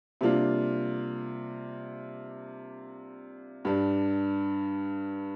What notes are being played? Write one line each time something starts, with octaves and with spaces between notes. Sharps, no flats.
C3 G3 A#3 D4 F4
G2 G3 D4